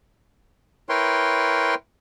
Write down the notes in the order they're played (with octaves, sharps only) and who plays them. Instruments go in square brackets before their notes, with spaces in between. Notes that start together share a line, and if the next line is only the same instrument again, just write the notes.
[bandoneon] E4 A#4 B4 C#5 G5 C6